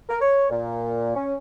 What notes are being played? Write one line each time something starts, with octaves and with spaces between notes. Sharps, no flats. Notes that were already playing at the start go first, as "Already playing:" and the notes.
A#4
C#5
A#2
C#4